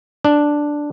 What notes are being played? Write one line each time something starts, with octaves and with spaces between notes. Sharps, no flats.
D4